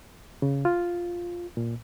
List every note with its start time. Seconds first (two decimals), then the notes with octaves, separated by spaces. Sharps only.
0.42 C#3
0.65 F4
1.57 A#2